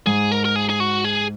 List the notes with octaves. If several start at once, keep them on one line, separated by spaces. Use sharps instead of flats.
G#2 G#4
A#4
A#4
G#4
G#4
F#4
G#4